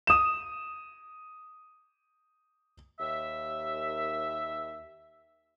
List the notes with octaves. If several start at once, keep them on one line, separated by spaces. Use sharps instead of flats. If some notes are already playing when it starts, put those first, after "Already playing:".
D#6 E7
D#2 E5